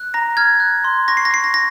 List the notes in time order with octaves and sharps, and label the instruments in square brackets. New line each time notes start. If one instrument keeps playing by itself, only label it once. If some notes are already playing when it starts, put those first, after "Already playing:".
Already playing: [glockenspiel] F#6
A#5 A#6
F6 G#6
F#6
C6
C#6 A#6
C7
A#6
C#6 C7
A#6
A#6